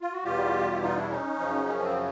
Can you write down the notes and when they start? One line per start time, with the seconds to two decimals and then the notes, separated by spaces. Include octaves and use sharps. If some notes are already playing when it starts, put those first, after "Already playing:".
0.01 F4
0.12 F#4
0.24 E2 B2 G3 F4 G4
0.73 E4
0.82 D#4 F4
0.96 D4 E4
1.10 C#4 D#4
1.39 F#2 C#3 F3
1.68 C#4
1.83 C4